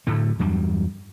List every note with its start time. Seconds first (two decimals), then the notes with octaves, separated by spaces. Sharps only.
0.07 D1 D2 A2 A3
0.39 E2 G2 F#3 G3